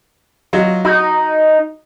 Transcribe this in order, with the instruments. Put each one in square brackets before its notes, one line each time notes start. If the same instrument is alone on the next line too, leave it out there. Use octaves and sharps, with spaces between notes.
[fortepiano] F#3 D#4 F4
[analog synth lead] D#4 [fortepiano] F#4